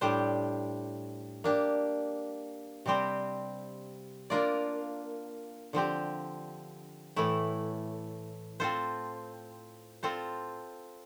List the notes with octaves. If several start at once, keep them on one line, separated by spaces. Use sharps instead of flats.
A2 G3 D4 G4 C5
A#3 D4 G4
C3 G3 C4 G4 C5
A#3 D4 F4 A#4 D5
D3 F3 C4 G4
A2 E3 A3 E4
C4 F4 A4 C5
C4 F4 A4 C5